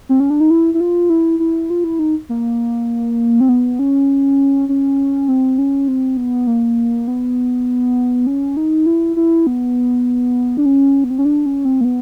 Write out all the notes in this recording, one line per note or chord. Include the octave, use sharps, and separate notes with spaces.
C4
C#4
D4
D#4
E4
E4
F4
E4
E4
F4
E4
D#4
A#3
C4
B3
C#4
C#4
C4
C#4
C4
B3
A#3
B3
C#4
D#4
E4
E4
B3
D4
C#4
B3
C4
C#4
D4
C#4
C4
A#3
B3